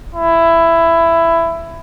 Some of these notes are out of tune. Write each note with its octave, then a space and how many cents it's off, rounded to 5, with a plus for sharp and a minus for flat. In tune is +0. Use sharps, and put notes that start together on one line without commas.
E4 +15